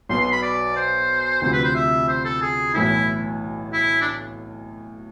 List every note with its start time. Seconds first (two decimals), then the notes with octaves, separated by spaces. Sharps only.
0.09 B1 B2 B3 C6
0.21 C6
0.32 B5
0.42 D5
0.76 C5
1.42 D2 C3 F3 C5
1.53 B4
1.65 C5
1.75 E5
2.08 C5
2.25 A4
2.42 G#4
2.74 B1 A2 E3 E4
3.73 E4
4.01 D4